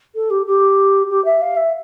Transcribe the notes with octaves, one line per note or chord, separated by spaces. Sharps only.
A4
G4
G4
G4
E5
F5
E5